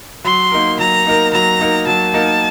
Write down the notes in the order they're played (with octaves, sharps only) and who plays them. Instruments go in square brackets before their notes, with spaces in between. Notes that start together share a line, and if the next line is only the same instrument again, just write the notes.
[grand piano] F#3 [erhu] C6
[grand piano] A#3 D#4 A#4
[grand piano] F#3 [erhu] A#5
[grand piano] A#3 D#4 A#4
[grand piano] F#3 [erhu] A#5
[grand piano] A#3 D#4 A#4
[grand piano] F#3 [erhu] A5
[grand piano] A#3 D#4 A#4